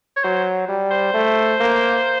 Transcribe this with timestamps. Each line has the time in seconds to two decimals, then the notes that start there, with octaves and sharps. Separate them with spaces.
0.17 C#5
0.24 F#3 C5
0.69 G3
0.91 C5
1.14 A3
1.60 A#3